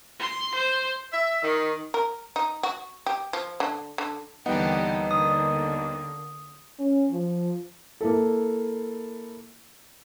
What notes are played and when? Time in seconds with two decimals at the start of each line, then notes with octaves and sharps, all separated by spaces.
0.20 C6
0.55 C5
1.13 E5
1.43 D#3
1.94 A#4
2.36 D#4
2.63 F#4
3.06 G4
3.33 F3
3.60 D3
3.98 D3
4.46 D#2 D3 E3 G3 B3 D#4 G4 F#5
5.11 D3 A#3 D#6
6.79 C#4
7.11 F3
8.01 A#3 E4 A4